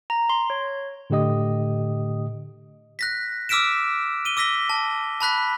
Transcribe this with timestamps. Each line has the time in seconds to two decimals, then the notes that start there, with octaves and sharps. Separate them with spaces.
0.10 A#5
0.30 C6
0.50 C#5
1.10 A2 D3 A3 G4 D#5 D#6
2.99 F#6 A#6 B6
3.49 D6 E6 F6 B6 D7 E7
4.25 D#7 G7
4.37 D6 E6 A#6 B6 G7
4.69 A5
5.21 A5 B5 F#6 B6